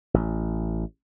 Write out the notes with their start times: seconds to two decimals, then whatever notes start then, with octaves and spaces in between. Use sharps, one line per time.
0.14 A1